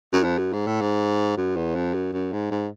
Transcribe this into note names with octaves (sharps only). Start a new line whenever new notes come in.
F#2
F2
F#2
G#2
A2
G#2
F#2
E2
F2
F#2
F#2
G#2
G#2